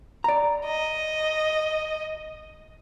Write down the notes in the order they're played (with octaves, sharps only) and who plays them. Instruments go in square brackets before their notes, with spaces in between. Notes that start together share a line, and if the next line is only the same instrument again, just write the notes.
[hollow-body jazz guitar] D5 A#5
[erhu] D#5